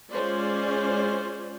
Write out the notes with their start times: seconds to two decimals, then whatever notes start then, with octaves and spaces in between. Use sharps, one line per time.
0.12 G#3 C#4 F4 C5 D5